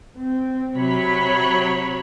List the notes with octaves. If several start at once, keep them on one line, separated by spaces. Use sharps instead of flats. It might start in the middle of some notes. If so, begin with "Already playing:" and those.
C4
C3 F#3 C#5 B5